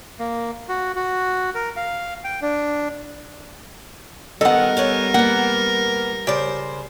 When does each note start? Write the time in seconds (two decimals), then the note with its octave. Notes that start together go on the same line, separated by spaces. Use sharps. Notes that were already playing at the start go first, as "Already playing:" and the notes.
0.19 A#3
0.69 F#4
0.96 F#4
1.55 A#4
1.76 F5
2.24 G5
2.42 D4
4.41 D#3 G3 B3 A4 A#4 D#5 F#5
4.77 B3 C#4 C#5
5.14 A#3 B3 F#5
6.27 C#3 G4 C5 D5